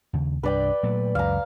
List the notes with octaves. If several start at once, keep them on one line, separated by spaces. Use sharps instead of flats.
D#2 C#3
C2 G2 D4 B4 D5 G5
A#2 F#3 A3
C#2 F#2 F5 A#5